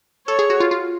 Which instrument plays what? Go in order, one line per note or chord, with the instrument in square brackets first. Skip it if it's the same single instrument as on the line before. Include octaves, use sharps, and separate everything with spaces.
[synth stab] A4 [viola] C#5
[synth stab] G#4
F#4
F4
F4